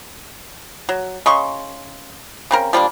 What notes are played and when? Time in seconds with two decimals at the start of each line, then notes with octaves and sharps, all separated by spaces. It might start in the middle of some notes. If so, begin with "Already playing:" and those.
0.89 F#3
1.26 C#3 D#5 C6 C#6
2.51 C#3 C4 A#4
2.73 F3 G3 A#3 D4